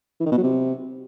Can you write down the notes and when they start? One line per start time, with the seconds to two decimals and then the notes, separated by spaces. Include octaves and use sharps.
0.20 E3
0.26 D#3
0.32 B2
0.38 F#3
0.43 C3